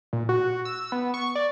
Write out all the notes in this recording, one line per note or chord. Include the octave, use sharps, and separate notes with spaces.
A#2
F#4
E6
B3
C#6
D5